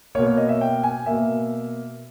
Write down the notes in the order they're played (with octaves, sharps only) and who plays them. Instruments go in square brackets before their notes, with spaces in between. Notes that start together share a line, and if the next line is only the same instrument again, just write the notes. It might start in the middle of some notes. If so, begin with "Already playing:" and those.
[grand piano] A#3 C#5
B2
C#5
D#5
E5
G5
G#5
B2 A#3 E5